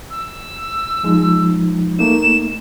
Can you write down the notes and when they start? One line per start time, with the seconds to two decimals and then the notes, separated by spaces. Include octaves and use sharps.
0.10 E6
1.03 F3 G#3 D#4
1.99 A3 A#3 D#4 E7